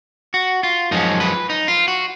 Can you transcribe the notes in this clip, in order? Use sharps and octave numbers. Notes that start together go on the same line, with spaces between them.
F#4
F4
F#2 F3 G#3 C#4 D#4
B4
D#4
F4
F#4